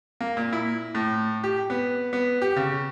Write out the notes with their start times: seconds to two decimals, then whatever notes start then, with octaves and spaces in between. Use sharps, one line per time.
0.21 A#3
0.37 A#2
0.53 E4
0.95 A2
1.44 G4
1.70 B3
2.13 B3
2.42 G4
2.56 C#3